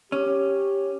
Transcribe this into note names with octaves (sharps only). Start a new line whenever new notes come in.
C#4 G4